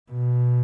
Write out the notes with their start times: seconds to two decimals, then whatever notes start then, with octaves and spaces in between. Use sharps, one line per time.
0.11 B2